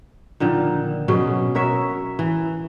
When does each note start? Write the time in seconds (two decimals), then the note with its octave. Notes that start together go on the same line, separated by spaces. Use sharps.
0.40 A#2 D3 D#3 F3
1.08 B2 F#3 C#4 G#4
1.55 F#4 A#4 C#5 E5
2.19 E3